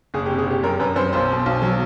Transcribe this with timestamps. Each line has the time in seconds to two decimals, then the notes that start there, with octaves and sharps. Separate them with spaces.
0.14 F#1 G#4
0.26 G4
0.31 C3
0.38 G#4
0.47 C3 G4
0.63 F#2 A#4
0.79 F#2 B4
0.96 F#2 C5
1.13 B1 C5
1.29 B2
1.46 B1
1.62 F#3